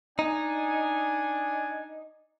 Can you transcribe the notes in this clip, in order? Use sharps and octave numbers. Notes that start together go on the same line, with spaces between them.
D4 D#4 G#5